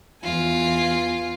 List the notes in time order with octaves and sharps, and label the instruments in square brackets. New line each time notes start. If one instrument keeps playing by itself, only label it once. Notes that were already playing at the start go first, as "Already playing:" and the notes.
[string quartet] E2 F4 G#5